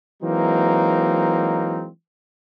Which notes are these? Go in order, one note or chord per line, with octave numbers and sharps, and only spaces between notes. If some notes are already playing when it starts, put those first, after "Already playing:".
E3 F#3 G#3 A#3 C4 D#4